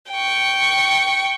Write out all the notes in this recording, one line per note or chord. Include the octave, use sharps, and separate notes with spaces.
G5 C#6